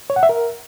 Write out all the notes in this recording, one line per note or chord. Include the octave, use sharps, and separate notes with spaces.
C#5
F#5
E5
A#4